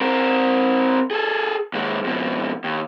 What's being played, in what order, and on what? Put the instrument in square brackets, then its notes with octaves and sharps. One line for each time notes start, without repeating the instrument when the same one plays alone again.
[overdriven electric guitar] C4 A#4
G#4 A4
D#2 G#3
F2 B2
D#2